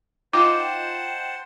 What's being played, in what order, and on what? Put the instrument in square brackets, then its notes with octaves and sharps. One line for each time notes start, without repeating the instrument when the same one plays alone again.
[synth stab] D#4 F4 [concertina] C5 F#5 A5 [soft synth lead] G5 [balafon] D6